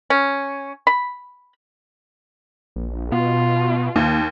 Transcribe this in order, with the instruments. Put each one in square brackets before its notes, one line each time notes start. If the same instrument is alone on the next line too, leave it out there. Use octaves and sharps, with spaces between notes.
[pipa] C#4
B5
[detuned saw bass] A#1
[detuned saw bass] B2 [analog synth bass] B3 [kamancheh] F4
[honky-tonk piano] D#2 [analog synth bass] A#3